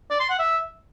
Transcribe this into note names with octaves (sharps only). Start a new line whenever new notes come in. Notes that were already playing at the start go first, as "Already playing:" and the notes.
D5
C6
F#5
E5